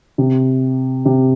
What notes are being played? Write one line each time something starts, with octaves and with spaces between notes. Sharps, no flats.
C3
C3